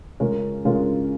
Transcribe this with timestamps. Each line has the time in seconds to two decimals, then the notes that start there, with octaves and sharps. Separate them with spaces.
0.20 C#3 G#3 C#4 F4 A#4
0.65 C#3 G#3 C#4 F4 A#4